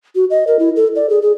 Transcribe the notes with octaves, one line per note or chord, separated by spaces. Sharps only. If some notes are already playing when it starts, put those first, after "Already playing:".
F#4
D#5
A#4
E4
A4
D5
G#4
G#4